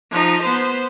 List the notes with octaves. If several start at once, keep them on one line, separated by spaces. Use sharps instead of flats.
F3 D#4
B3 C5